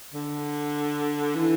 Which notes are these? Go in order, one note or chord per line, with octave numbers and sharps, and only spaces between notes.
D3
E3